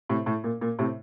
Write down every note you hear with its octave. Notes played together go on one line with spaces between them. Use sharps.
A2 C3
A2
A#2
A#2
A2 C3